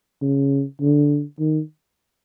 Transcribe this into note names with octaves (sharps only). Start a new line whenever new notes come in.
C#3
D3
D#3